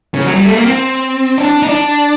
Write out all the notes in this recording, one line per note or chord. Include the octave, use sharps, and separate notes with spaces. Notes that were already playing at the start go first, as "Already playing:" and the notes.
C#3
F#3
G3
A3
A#3
C4
D4
D#4
D4